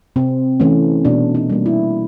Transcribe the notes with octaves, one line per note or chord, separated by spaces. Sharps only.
C3 C4
E3 A3 C#4
B2 D4
D#4
G3 A#3
E4